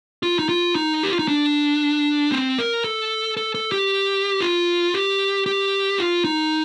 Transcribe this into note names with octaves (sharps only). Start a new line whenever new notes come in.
F4
D#4
F4
D#4
G4
F4
D#4
D4
C4
A#4
A4
A4
A4
G4
F4
G4
G4
F4
D#4